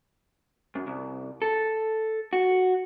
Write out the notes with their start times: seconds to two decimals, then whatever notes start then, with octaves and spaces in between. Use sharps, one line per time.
0.75 F#2
0.87 C2
1.42 A4
2.33 F#4